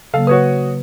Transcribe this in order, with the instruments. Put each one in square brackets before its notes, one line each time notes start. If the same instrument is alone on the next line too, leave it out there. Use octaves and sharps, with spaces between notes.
[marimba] C#3 F#3 A#3 [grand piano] A4 F5
[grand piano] F#4 C#5 D#6 [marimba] B4